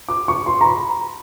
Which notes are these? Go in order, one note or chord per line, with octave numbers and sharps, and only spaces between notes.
D6
C#6
C6
A#5
B5